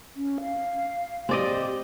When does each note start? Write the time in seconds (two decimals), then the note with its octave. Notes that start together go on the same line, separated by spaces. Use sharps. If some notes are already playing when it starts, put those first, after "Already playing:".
0.16 C#4
0.41 F5
1.29 C4 G4 D5 D#5